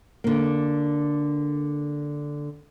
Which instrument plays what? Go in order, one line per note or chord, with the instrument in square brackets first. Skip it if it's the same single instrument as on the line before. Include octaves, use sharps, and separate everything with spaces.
[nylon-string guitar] D3 A#3